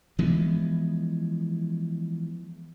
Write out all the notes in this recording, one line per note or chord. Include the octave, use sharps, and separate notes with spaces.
E3 F3 G#3 B3